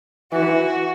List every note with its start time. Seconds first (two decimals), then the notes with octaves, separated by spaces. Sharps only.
0.32 E3 F#4